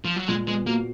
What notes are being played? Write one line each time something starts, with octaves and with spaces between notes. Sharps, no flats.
F3
F#3
A#2 G#3
G#3 B3
A#3 F#4